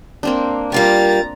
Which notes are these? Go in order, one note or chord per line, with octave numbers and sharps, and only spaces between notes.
A#3 C4 D4
G3 F4 G4 A#4 A#5 A6